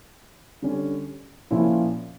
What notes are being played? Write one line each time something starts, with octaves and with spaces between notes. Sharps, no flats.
D3 G3 C#4
A#2 F3 C#4 E4